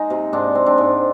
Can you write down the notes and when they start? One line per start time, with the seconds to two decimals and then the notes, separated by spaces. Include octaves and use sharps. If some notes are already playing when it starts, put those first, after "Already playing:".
Already playing: G#3 D#4
0.10 C3
0.33 G#2 C4 D4
0.55 C4
0.66 C4 D4
0.78 G#2